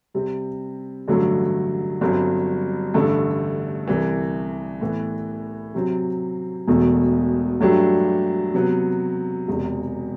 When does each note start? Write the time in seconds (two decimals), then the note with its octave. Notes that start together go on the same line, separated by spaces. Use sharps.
0.14 C3 G3 C4
1.08 A1 G2 D3 F#3 A3
2.01 G1 G2 F#3 C4
2.94 A1 G2 D3 A3
3.87 C2 C3 E3
4.81 A2 E3 B3
5.74 C3 F#3 C4
6.67 E1 E2 B2 A3
7.61 G2 F#3 A3 D4 G4
8.54 C3 F#3 B3
9.47 E1 E2 C3